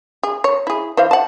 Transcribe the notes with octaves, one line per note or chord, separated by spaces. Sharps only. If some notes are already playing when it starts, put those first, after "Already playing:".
G#4
C#5
E4 G#4
E3 C5 F5
F#5 A5